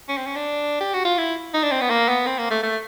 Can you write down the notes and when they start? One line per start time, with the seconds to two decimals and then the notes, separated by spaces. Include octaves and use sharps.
0.09 C#4
0.17 C4
0.27 C#4
0.36 D4
0.81 G4
0.93 F#4
1.05 F4
1.18 E4
1.54 D#4
1.63 D4
1.71 C4
1.81 B3
1.90 A#3
2.09 B3
2.26 C4
2.39 A#3
2.51 A3
2.63 A3